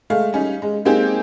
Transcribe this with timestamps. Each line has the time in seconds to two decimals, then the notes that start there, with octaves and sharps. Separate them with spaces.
0.10 G#3 A3 F5
0.33 G3 C#4 D#4
0.62 G#3
0.85 G#3 A#3 C4 D#4 G4 G#4